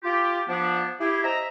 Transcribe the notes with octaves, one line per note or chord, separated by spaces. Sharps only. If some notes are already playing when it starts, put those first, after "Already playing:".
F4 G4
F3 B3 D4
E4 G4 G#4
C4 D#5 E5 A#5